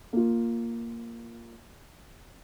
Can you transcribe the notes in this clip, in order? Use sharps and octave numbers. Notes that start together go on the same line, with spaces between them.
A#3 F4